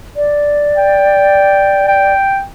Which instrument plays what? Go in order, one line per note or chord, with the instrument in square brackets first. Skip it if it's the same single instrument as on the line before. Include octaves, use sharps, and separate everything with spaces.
[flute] D5
[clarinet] G5
G5